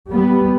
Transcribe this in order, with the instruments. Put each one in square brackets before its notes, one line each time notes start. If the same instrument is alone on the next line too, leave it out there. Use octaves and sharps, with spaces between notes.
[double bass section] G3 B3